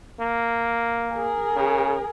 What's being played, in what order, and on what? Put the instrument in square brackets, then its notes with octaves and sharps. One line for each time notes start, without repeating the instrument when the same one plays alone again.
[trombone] A#3
[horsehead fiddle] G#4 A#4
[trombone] C#3